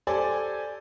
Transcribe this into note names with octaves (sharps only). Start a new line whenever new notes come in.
G4 A4 C5 D5 G#5